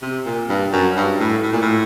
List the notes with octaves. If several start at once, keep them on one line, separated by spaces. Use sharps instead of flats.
C3
A#2
G2
F#2
G2
A2
A2
A#2
A2